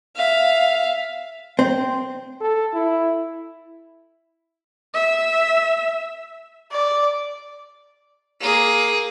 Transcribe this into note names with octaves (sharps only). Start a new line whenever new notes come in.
E5 F5
C4
A4
E4
E5
D5
A#3 G#4